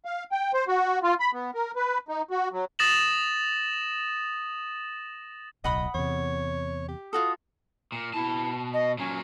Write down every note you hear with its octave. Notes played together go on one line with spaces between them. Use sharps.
F5
G5
C5
F#4
F4
B5
B3
A#4
B4
D#4
F#4
F#3
D#6 A6 A#6 E7 F#7
D1 B1 D#5 F#5 B5 D#6
E2 C3 C#5
G4
F4 F#4 A4 D#6
A#2
B2 E4 A5
D#5
A#2 F#3 C#4